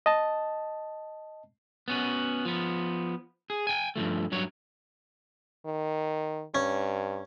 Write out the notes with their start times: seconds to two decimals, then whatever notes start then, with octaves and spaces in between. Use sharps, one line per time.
0.06 D#5 A5
1.88 B3 C#4 F#4
2.45 F3 B3
3.50 G#4
3.67 G5 G#5
3.96 G2 E3 F3 A3
4.32 G2 F#3 C#5
5.66 D#3
6.55 G2 C#4